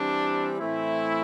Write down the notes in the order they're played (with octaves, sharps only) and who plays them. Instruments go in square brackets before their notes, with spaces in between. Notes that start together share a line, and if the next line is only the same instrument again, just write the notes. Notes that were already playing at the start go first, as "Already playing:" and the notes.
Already playing: [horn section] E3 G3 C4 D4
A2 E3 A3 C4 E4